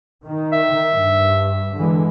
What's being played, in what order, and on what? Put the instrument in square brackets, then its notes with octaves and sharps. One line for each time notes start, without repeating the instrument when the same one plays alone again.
[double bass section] D#3
[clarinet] E5
[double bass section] G2
D3 E3 G#3